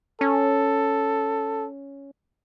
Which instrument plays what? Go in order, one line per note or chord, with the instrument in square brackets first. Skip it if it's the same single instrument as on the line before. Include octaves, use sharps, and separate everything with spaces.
[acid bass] C#4 [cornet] A4